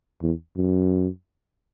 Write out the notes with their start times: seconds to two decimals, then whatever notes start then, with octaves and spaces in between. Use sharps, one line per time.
0.22 E2
0.56 F#2